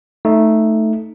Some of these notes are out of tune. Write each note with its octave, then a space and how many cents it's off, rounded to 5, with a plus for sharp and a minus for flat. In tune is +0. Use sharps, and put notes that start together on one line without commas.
A3 +0 D#4 +5